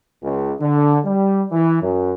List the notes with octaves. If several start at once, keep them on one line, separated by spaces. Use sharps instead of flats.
C#2
D3
G3
E3
F#2